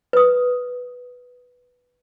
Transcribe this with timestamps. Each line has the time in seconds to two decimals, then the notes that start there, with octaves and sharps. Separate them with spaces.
0.13 B4 D#6